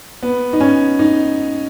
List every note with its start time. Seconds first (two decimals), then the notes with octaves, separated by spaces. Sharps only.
0.23 B3
0.53 D#4
0.61 C#4
0.99 D#4